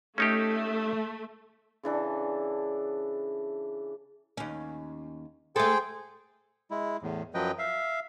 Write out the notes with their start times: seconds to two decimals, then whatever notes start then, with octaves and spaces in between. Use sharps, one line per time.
0.18 A3 C#4 D#4 G4
1.83 C#3 E3 D4 A4
4.37 D#2 C#4
5.56 A3 G#4 A4 C5 G5
6.71 G#3 E4
7.02 E2 A2
7.34 F#2 F3 F#3 B4 D#5 G5
7.59 E5 F5